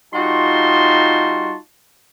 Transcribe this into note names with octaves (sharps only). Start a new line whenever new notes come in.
G3 D#4 F4 F#4 A5 C6